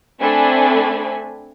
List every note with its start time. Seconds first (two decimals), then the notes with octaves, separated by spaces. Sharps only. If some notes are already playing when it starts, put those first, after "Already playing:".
0.21 A3 C4 D4 A4 G#5 B5